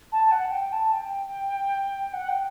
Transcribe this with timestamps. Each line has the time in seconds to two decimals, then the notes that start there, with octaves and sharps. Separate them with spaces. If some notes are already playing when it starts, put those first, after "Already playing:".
0.12 A5
0.32 F#5
0.52 G5
0.72 A5
0.93 G5
2.13 F#5
2.29 G5